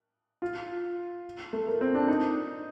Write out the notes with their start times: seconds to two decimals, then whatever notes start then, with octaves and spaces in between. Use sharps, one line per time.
0.42 F4
1.53 A3
1.67 A#3
1.81 C4
1.94 D4
2.08 D#4